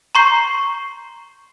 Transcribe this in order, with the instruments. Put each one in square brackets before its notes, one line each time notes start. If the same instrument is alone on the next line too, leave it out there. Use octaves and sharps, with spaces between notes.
[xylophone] A#5 C6 C#6 G6 C7